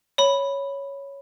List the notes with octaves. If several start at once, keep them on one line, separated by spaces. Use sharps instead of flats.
C#5 B5